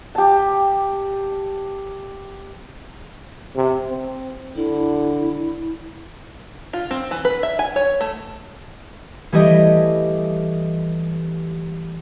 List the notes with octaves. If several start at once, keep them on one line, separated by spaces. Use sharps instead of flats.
G4 A5
C3
C4
D3 E4
F4
C4
E3
B4
E5
G#5
C#5
A3
E3 G3 A3 G4 C#5 D#5